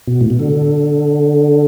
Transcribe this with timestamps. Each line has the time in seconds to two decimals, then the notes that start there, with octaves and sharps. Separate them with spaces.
0.07 B2
0.21 A2
0.30 B2
0.40 D3